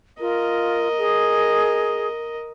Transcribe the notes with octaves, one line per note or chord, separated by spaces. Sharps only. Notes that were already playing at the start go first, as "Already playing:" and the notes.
F4 A#4 D#5
G#4